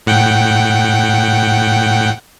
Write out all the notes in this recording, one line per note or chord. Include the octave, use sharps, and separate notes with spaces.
A2 F#5 G5